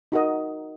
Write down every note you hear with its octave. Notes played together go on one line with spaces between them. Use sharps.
D#4 F#4 A#4 D#5